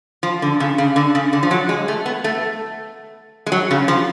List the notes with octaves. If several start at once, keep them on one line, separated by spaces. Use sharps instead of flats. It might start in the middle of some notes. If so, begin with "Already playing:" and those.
F3
D3
C#3
C#3
D3
C#3
D3
F3
F#3
G#3
A3
B3
A3
G#3
F#3
C#3
F3